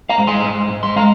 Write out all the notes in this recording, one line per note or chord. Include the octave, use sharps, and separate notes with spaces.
F5 A#5
G#2
G#5 C6
G#2
G#2
C6
G#3 F5 A#5